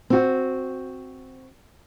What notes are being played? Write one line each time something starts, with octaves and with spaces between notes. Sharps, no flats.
C4 F#4